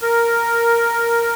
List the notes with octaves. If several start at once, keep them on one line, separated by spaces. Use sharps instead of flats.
A#4